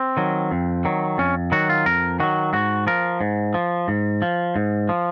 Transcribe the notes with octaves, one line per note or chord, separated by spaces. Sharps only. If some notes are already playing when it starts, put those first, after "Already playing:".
Already playing: C4
D#3 F#3
F2
D#3 F#3
F2 C#4
D#3 F#3 F#4
F4
F2 A#4
D#3 F#3 F#4
G#2 F#4
F3 A#4
G#2
F3
G#2
F3
G#2
F3